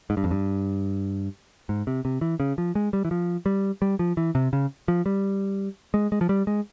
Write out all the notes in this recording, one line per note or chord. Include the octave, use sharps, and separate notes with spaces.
G#2
G2
F2
G2
G#2
C3
C3
E3
C#3
F3
G#3
G3
E3
F3
G3
G3
F3
E3
C3
C#3
F3
G3
G#3
G#3
F3
G3
G#3